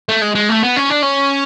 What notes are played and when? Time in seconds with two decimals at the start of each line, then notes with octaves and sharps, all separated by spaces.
0.09 A3
0.22 G#3
0.35 G#3
0.49 A3
0.63 B3
0.76 C#4
0.90 D4
1.02 C#4